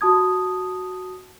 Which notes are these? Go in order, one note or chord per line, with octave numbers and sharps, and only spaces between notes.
F#4 A5 D#6 G#6